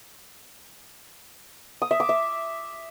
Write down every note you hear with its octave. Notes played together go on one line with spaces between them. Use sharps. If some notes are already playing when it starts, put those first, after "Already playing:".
D#6
E5
D6
E5